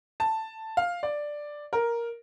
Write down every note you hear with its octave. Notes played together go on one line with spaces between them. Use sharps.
A5
F5
D5
A#4